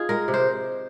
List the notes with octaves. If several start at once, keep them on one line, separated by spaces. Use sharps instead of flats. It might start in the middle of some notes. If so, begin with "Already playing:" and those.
Already playing: D#4 F4 G#4
G#3 A#4
C3
C5